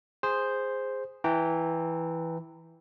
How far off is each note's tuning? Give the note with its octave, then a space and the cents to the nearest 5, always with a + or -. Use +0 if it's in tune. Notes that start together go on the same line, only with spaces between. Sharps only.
G#4 -10 C5 +0
E3 -5 G5 +0 A#5 -30